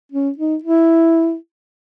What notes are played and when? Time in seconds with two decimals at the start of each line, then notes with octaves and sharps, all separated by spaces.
0.12 C#4
0.38 D#4
0.63 E4